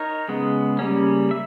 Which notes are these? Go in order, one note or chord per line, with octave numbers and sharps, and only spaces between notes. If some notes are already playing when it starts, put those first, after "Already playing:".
Already playing: D#4 A#4 C#5
C#3 G#3 B3
C#3 G3 A#3 C#4
E5